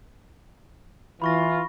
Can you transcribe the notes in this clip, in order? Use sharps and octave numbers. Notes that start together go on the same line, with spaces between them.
E3 F4 B5 C#6 A#6